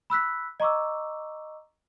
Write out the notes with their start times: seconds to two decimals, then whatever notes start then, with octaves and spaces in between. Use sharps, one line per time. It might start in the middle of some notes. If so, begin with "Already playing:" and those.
0.10 B5 E6 F#6 B6
0.60 D#5 A#5 C#6 D6 E6